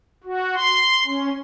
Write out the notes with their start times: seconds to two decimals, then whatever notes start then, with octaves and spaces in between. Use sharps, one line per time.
0.24 F#4
0.56 C6
1.05 C#4